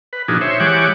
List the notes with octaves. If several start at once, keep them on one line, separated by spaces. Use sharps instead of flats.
B4
A#2 F3 D4 D#4 F#4 G#4
C5 C#5 E5
E3 G#3 G4 C#5 F#5 D6